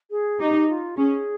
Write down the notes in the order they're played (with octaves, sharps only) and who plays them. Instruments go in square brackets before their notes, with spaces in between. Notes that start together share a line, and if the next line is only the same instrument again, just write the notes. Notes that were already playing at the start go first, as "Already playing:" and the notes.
[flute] G#4
[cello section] D#4 [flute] G4
[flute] F4
[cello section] C#4 [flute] G#4